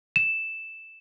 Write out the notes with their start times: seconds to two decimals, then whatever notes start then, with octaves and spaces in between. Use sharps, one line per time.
0.16 E7